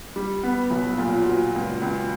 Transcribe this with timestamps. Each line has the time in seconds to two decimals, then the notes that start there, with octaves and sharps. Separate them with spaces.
0.16 G3
0.43 B3
0.71 B1
0.98 A#2
1.26 F#3
1.54 C#2
1.82 C#2